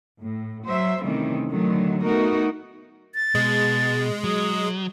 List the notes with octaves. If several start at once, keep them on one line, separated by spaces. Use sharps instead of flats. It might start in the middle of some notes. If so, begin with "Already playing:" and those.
A2
F#3 C5 E5
C3 D#3 E3 G3 A3 C#4
D3 D#3 F#3 A3
A3 B3 D#4 F#4 A#4
A6
B2 G#3
F#3 D#6